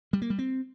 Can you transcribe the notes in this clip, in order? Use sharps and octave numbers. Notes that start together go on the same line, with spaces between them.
G3
A#3
G3
C4